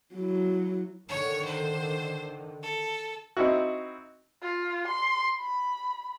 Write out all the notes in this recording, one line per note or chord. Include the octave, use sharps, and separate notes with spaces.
F#3 E4
D3 D#3 C#5
C5
A4
C4 D#4 E4 F#4
F4
C6
B5